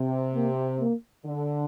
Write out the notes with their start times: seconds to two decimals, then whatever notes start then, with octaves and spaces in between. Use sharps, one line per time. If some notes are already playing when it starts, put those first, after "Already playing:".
Already playing: C3
0.35 A#3
0.81 A#3
1.25 D3